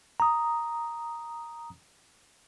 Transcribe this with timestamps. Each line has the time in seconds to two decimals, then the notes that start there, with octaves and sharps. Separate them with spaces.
0.20 A#5 D#6